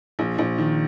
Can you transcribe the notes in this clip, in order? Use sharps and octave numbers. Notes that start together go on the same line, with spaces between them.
A#1
A#1
D#3